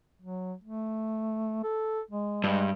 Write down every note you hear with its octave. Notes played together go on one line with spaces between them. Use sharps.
F#3
A3
A4
G#3
G2 G#3